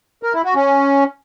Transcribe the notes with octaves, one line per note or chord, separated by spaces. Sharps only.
A#4
E4
F#4
C#4